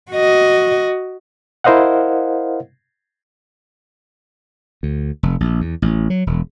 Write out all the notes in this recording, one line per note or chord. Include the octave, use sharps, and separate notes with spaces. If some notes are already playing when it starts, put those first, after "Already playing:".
F#4 D#5
E4 A#4 C5 D#5 F5 F#5
D2
F1
A#1
E2
A1
F#3
E1